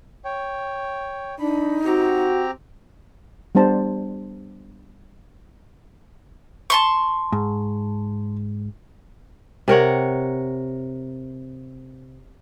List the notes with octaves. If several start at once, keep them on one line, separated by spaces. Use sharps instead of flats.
C#5 G5
D4 D#4 B5
C4 F#4 G4 A#5
G3 B3 D4 C5 A5 A#5
A5 C6 C#6
G#2
C3 A#4 C#5 F#5